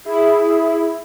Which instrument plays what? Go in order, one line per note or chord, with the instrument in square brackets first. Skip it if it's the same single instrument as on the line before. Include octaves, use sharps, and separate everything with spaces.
[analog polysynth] E4 [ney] G#4